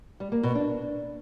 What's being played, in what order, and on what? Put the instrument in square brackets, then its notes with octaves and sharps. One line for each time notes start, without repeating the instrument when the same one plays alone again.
[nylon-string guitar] G3
A#3
B2
D4